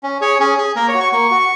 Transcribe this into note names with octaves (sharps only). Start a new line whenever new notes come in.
C#4
G#4 C#5
C#4 G#4
G#4
A#3 A#4
C#5
F#4
C#6
A#3 C#6
F#4